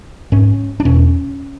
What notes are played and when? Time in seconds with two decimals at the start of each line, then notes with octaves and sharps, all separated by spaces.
0.32 G#2 C#4
0.80 D4
0.85 E2 B2 C#4